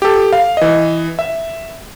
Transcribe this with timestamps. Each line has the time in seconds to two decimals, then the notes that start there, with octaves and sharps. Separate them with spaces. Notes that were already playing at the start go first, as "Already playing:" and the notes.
0.02 G4 A4
0.33 F5
0.57 E3 D#5
1.19 E5